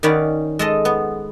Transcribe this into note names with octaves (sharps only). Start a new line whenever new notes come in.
D#3 C#4 D5 F#5 B5
G#3 A4 D#5
B3